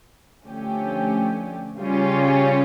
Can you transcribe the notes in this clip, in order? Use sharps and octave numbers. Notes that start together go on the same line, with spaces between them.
D3 F3 A3 C#4 G4
C#3 G3 C#4 F4